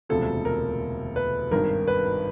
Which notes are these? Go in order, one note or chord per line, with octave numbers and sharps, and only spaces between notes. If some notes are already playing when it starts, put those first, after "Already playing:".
E1 D2 C3 F3 A4
A#4
B4
G#1 G2 D#3 A#4
B4